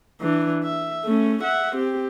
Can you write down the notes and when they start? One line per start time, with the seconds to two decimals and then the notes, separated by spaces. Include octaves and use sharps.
0.21 E3 D4
0.63 E5
1.05 A3 C#4
1.43 E5 F#5
1.75 C4 G4